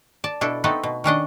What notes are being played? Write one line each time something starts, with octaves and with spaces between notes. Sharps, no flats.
D5 A5
B2 D4 E4 A4
A3 B3 C4 D#4 A4 B4
B2
D#3 C#4 D4 D#5